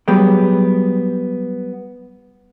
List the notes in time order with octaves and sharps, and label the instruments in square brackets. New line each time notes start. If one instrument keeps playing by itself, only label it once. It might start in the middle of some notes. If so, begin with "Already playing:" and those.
[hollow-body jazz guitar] F#3 G3 B3 G#4 G5